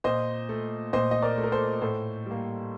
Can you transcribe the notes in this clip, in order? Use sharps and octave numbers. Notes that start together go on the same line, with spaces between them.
A#2 C5 D#5
A3
A#2 C5 D#5
D#5
A#4 D5
A3
A#4
A4 C5
A2 A4 C5
G3 A#3